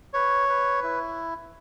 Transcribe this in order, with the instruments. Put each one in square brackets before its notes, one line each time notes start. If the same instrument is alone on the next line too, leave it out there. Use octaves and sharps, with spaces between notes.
[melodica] B4 [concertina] C#5
[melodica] B4
E4